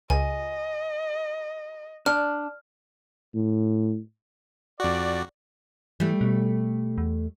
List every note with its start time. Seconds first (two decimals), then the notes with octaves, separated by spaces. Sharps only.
0.10 C#2 D#5 G#5
2.06 D4 F6
3.34 A2
4.80 F2 F#4 D5
6.00 E3 G3 A3
6.21 B2
6.98 E2